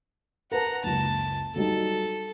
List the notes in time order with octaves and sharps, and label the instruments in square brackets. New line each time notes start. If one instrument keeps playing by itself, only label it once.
[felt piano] A#4 B4 A5 [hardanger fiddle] F#5 A#5
[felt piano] F#1 C#2 [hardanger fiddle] A5
[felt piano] F#3 G3 D#4 [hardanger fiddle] A4